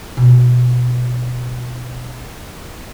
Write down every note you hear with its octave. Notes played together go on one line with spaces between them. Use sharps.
B2 A#3